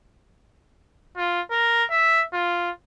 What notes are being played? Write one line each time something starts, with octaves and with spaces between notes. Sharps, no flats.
F4
A#4
E5
F4